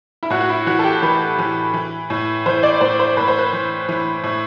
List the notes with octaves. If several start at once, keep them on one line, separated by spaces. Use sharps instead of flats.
E4
A2 F#4
F#4
E4
E3 F#4
A4
G4
E3 B4
E3
E3
A2
E3 C5
D5
A2 C5
C5
A2 B4
C5
B4
E3
E3
A2